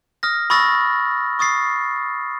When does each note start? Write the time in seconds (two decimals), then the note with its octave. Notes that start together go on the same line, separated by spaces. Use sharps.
0.23 D#6 F6 A#6
0.50 B5 C#6 D#6 E6 A6 A#6
1.39 C#6 D#6 A6 C7